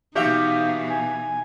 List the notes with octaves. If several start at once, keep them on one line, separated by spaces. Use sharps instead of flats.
B2 E3 D#4 F#4 G4 E5 F5
G#5